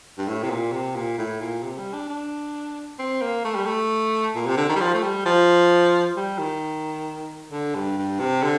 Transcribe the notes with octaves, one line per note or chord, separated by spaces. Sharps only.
G2
A2
C3
A#2
C3
A#2
A2
A#2
C3
G3
D4
D4
C4
A#3
A3
G3
A3
A#2
C3
D3
D#3
G3
F3
A3
G3
F3
G3
D#3
D3
G2
G2
C3
D3